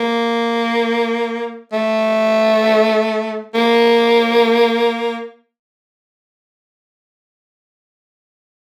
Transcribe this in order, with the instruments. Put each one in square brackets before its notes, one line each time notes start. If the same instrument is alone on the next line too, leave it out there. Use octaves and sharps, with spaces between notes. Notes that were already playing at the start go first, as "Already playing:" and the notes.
Already playing: [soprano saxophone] A#3
A3
A#3